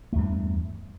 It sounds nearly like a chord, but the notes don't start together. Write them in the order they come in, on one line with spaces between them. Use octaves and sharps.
A3 E2 G2